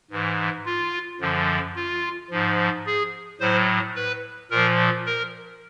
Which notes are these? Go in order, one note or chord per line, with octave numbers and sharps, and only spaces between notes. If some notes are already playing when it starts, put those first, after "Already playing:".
G#2 E3
F4
F#2 D3 F3
F4
G#2 F3
G#4
A2 F#3 C5
B4
A#2 F3 A#4
A#4